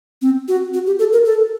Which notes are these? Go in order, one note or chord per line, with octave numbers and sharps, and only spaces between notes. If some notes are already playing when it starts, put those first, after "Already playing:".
C4
F#4
F#4
G4
A4
A#4
A4